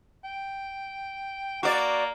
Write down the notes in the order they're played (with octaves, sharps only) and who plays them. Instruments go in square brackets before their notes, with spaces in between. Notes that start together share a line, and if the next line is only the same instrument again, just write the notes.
[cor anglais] G5
[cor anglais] A#3 [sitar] F#4 D5